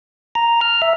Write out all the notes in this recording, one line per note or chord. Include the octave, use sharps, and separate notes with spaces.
A#5
F6
E5